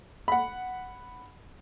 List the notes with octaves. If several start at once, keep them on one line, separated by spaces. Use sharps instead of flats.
F#5 B5